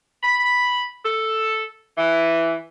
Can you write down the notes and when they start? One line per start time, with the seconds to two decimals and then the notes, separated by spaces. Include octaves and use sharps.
0.23 B5
1.05 A4
1.98 E3